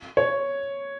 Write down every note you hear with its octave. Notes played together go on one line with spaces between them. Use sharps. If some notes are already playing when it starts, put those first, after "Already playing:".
C#5